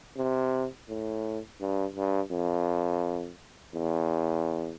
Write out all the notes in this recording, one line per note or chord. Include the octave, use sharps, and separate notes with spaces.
C3
A2
G2
G2
F2
E2